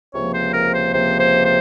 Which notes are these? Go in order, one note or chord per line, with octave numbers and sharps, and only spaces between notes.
C#2 C3 F3 A#3 C#5
C5
A#4
C5
C#2 C3 F3 A#3 C5
C5
C5